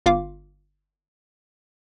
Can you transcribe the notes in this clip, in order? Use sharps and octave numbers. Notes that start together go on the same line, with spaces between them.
G1 F4 F5 D6